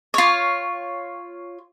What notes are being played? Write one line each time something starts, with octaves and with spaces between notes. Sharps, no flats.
F4 C#5